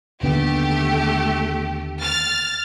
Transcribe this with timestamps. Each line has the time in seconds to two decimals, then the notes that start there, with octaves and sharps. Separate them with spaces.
0.23 D#2 D3 A3 B3 G4
2.02 F6 A6